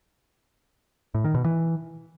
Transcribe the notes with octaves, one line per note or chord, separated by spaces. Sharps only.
A2
D#3
B2
E3